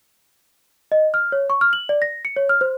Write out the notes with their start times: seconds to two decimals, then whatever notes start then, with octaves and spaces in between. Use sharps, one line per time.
0.92 D#5
1.14 F6
1.32 C#5
1.50 C#6
1.61 F6
1.73 F#7
1.89 D5
2.02 A#6
2.25 C#7
2.37 C#5
2.49 F6
2.61 C5